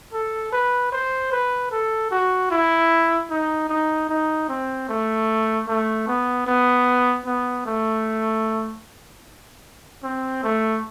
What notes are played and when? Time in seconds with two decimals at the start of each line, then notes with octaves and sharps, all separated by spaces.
0.13 A4
0.52 B4
0.92 C5
1.32 B4
1.72 A4
2.11 F#4
2.51 E4
3.30 D#4
3.69 D#4
4.09 D#4
4.49 C4
4.89 A3
5.67 A3
6.07 B3
6.47 B3
7.26 B3
7.66 A3
10.04 C4
10.43 A3